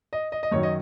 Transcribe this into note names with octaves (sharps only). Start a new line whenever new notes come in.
D#5
D#5
D#5
F#2 D#3 F#3 C#5
D#5